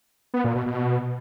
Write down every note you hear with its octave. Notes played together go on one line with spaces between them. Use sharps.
B3
A#2
B2
B2